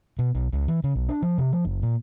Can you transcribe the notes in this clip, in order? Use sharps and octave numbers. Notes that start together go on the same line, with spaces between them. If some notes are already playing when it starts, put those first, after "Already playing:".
B2
B1
C#2
E3
C#3
B1
D4
F3
C3
F3
F#1
A#2